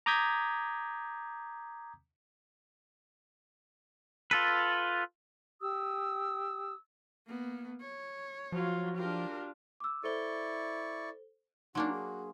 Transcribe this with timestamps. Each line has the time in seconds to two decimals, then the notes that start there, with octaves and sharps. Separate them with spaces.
0.06 A#5 D6 D#6 G6 G#6 B6
4.31 F4 A4 B4
5.62 G4 D#6 E6
7.27 A#3 B3
7.81 C#5
8.52 F3 F#3 F4
8.97 D4 F4 G4 A#4
9.80 D6 E6
10.04 E4 A4 C5 D5 C#6 G7
11.75 F#3 A#3 D4 D#4 F#4 G#5 C6
11.93 G#4